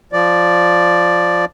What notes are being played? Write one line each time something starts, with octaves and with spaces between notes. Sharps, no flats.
F3 D5